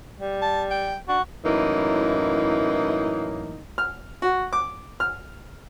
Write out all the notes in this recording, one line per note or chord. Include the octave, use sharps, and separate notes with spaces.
G3
A5
G5
D4 F#4
F#2 A2 E3 A#3 D#4
F6
F#4
D6
F6